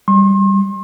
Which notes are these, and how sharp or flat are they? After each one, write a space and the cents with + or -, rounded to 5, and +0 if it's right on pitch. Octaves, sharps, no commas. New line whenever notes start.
G3 +0 C6 +40